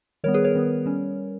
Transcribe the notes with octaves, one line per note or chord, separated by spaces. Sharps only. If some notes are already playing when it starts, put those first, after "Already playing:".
D#3 G3 B3 A#4 C#5
G#4 B4
A#4 C#5
D#3 G3 B3
G3 C#4